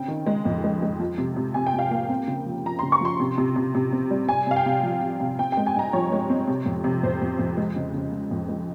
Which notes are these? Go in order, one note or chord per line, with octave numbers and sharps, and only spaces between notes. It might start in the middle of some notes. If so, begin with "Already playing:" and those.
Already playing: C#3 C4 G5
D#3
G#3
F2
G#3
G#3
F3
C3
C3
C3 G#5
G5
C3 F5
A#3 G5
C4
C#3
F3
F3 A#5
C#3 C6
C#6
F3 C6
C3
C3
C3
C3
C4
G3
C3 G#5
C3 F5
G5
C3
F3
F3
C3
C4 G5
G5
G#3
G#5
G2 A#5
F3 C#5
G#3
C4
C3
F2
C3
F2 C5
F2
F2
G#3
C#3
C#3
C#3
F2
G#3